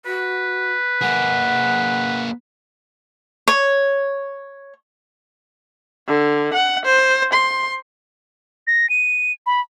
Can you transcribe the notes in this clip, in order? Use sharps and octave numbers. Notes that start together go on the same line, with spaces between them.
F#4 B4
A#3 G#4 F#5
C#5
D3
F#5
C5
C6
A#6
D#7
B5